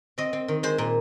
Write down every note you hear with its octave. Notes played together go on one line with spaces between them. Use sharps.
C4 D#5
C4
D#3
G#3 C5
A#2